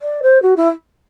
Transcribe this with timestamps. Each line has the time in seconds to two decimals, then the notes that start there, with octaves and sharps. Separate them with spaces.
0.02 D5
0.23 C5
0.42 F#4
0.57 E4